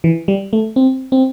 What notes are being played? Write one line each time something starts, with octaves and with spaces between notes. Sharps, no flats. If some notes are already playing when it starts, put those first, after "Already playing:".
E3
G3
A3
C4
C4